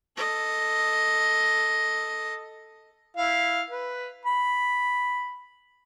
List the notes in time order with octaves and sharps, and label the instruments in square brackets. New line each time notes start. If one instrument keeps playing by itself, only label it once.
[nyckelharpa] A4 D#5
[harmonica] E4 F5
B4
B5